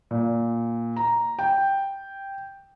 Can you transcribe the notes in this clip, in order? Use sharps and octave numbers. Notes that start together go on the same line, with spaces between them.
A#2
A#5
G5